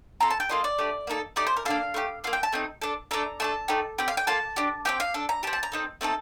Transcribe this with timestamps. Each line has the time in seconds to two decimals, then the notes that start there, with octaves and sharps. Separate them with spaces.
0.20 C4 F4 A4 A#5
0.30 A5
0.40 G5
0.49 A#3 F4 A4 D#5
0.64 D5
0.78 A3 D4 G4
1.07 A#3 D#4 A4
1.36 A3 D#4 G4 D5
1.47 C5
1.57 A#4
1.65 A#3 D4 A4 F5
1.94 A3 D#4 G4
2.24 A#3 F4 A4 F5
2.33 G5
2.43 A5
2.52 A3 C4 D#4
2.82 D4 A4
3.11 A3 D4 A4 A#5
3.40 A3 D4 A4 A5
3.68 A3 D#4 G4
3.98 C4 G4 G5
4.08 F5
4.17 G5
4.27 A#3 F4 A4 A5
4.56 D4 G4
4.85 C4 D#4 G4 G5
5.00 F5
5.14 D4 A4
5.29 A#5
5.43 G4 A5
5.47 C4
5.53 A5
5.63 A#5
5.72 C4 D#4 A4
6.01 A3 C4 D#4 A4